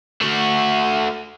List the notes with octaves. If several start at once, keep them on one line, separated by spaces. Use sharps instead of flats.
A3 F#4